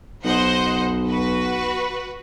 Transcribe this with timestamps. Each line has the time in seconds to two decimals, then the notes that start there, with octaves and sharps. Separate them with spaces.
0.25 B1 C5 D#5 F#5
1.08 F#4 B4